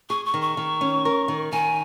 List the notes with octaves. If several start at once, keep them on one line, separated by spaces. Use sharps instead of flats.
G#4 C#6
C#6
D#3
C#6
D#3
C#4
A#4
D#3
D#3 G#5